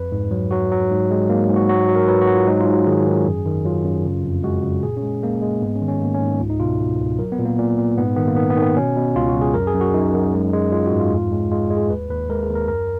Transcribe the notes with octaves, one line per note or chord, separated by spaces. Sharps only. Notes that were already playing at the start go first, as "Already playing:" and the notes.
Already playing: F2 B4
G#2
F#3
F#3 F#4
F#3
G#2
G#3
G#2 A#3
G#2
F#4
F#3 F#4
F#3
A#4
F#3 B4
F#4
F#3
F4
G#2 D#4
F4
G#2
F#4
D#3 G#4
D#3
F#2
D#3
F#3 F4
F#2
C#3
F2
G#3 F#4
C#3
A#2 G#4
C#4
G#3
G#3 A#3
G#3
G#2 B3
C#4
D#3
C#4
G#2 A#3
C#4
G#2
C#2 F4
D#4
B2 F4
B2
C#2
F#3 A#4
B3
A#2
A#3
A#2
A#2
G#2 B3
D#3 B3
A#3
D#3 B3
B3
D#3
B3
B2 C#4
B2
C#2 F4
F#4
C#2
G#4
F#2 A#4
G#4
F#2
F#4
F#2 D#4
F#2
G#3
G#3
G#3 F4
F#4
G#2
F4
F2
G#3
G#3 F4
G#3
G#4
D#2 B4
D#2 B4
G#3 A#4
G#4
D#2
A#4
F#2 A#4